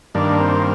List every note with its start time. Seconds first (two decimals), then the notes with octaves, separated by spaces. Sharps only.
0.15 G2 D#3 A#3 D4
0.40 C4